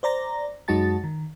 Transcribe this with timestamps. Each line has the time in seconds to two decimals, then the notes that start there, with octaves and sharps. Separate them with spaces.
0.03 C5 D5 A#5 A#6
0.68 F#2 G#3 D#4 F#4 A5 A6
1.04 D#3